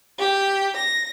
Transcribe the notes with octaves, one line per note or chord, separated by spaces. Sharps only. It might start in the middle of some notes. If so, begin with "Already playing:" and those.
G4
A#6